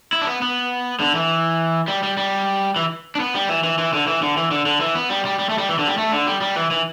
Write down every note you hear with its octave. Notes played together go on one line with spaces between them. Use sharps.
E4
D4
B3
B3
D3
E3
G3
G3
G3
E3
D4
B3
G3
E3
E3
E3
D3
E3
D3
E3
D3
D3
E3
B3
G3
G3
G3
A3
G3
E3
D3
G3
A3
D3
G3
G3
E3
E3